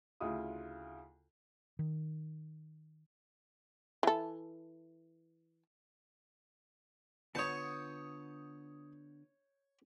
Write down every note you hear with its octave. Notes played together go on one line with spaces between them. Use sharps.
D2 C#3 E4 F4 D#6
D#3
E3 A4
D3 B3 F4 C#5 A5 D#6 G6 C#7